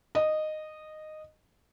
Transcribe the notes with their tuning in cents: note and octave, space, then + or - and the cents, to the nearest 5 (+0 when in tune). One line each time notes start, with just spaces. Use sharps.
D#5 -10